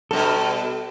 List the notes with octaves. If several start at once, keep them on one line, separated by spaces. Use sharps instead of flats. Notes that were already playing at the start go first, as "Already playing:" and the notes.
G2 B2 A4